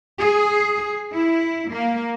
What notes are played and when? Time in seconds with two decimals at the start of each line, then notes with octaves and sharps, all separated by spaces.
0.19 G#4
1.13 E4
1.70 A#3